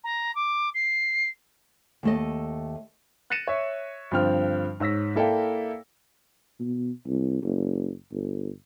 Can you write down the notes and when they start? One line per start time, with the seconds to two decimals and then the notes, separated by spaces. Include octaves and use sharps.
0.04 A#5
0.35 D6
0.74 C7
2.03 D#2 A3 D#5
3.30 F#6 A6 A#6 C#7 D#7 E7
3.48 C#5 E5
4.11 G2 D3 F3 C4 G5 F6
4.80 G#2 C#5 E6 A#6 B6
5.15 A#3 E4 A4 D5 F5 G5
6.60 B2
7.07 C2
7.42 F#1
8.12 G1